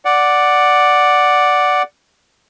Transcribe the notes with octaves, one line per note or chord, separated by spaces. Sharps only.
D5 F#5